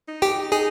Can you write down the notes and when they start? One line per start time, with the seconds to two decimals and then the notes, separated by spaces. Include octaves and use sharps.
0.08 D#4
0.22 G4 G5
0.52 D#4 G#4 G#5